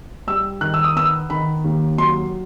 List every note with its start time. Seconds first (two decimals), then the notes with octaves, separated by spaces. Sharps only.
0.27 G3 E6
0.61 D#3 F#6
0.74 E6
0.84 D#6
0.96 B3 E6
1.30 D#3 B5
1.64 D#2
1.98 F#3 C6